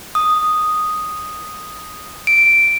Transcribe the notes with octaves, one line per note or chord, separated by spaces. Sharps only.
D#6
D7